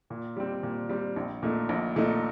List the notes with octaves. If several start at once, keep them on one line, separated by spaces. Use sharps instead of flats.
A#2
G3 C4
A#2
G3 C4
A#1
A#2 A3 D#4
A#1
A#2 A3 D#4